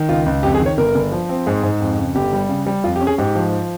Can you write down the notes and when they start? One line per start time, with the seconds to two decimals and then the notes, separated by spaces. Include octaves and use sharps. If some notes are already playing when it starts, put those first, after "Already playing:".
Already playing: D#3
0.09 C#2 F4
0.26 C#2
0.43 F2 G4
0.55 G#4
0.60 D#3
0.66 C#5
0.78 G1 A#4
0.95 G1
1.12 F3
1.29 C4
1.47 G#2 G#4
1.63 G#2
1.81 F2
1.98 C#3
2.15 G1 G4
2.33 G3
2.49 C#3
2.66 G3
2.84 F2 F4
2.96 G4
3.01 C#4
3.07 G#4
3.18 G#2 G4
3.35 F3